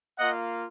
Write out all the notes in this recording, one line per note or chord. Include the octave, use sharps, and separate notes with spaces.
A#3 F4 D#5 F#5